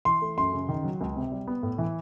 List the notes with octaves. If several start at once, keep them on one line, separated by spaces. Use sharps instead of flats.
E3 C6
A3
F#2 C6
C#3
D#3
F#3
C#2
C3
G3
B3
A2
E3